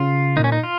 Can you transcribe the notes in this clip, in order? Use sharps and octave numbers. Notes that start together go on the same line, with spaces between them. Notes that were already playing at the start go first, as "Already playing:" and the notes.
Already playing: C#3 F4
A#2 D#4
C#4
D#4
F4